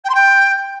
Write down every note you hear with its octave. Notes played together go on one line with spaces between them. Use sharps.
G5
C6
G5